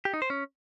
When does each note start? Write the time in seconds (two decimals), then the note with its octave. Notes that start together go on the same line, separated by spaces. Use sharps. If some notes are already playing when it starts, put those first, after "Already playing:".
0.05 G4
0.14 D#4
0.22 C5
0.30 C#4